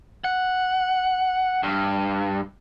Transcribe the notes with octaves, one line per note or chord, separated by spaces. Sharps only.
F#5
G2